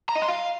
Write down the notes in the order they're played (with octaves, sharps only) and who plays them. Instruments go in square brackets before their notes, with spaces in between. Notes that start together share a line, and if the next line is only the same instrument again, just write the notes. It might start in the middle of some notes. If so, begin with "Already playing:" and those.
[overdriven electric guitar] A#5
D#5
C6
F5